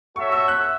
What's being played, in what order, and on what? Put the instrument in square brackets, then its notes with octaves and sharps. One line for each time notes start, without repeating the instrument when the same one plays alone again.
[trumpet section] F#4 A4 C#5 E5 [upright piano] C#6
[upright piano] E6
F#6